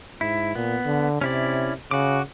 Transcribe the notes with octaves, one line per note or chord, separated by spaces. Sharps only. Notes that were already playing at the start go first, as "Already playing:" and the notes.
G#2 E4
A#2 B3
D3
C3 C#4 E4 D5
C#3 F#4 D6